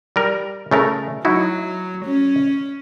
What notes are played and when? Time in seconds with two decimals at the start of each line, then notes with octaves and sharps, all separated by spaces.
0.16 G3 A#4
0.71 C#3 A3 A#4
1.25 F#3 D#4 E4 F#4
2.05 C#4